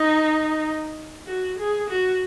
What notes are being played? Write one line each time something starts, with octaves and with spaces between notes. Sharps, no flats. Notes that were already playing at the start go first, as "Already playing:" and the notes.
Already playing: D#4
F#4
G#4
F#4